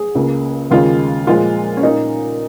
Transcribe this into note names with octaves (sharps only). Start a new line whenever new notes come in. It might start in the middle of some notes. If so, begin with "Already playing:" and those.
Already playing: G#4
C#2 C#3 A#3
D#2 C#3 G#3 F4
A#2 F3 G#3 F4
C#4
A#2 A#3 D#4